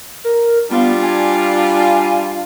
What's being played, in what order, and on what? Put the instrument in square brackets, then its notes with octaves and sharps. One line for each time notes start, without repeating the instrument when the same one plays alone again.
[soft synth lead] A#4
[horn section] G3 D4 F4 [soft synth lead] B3
[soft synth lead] G#5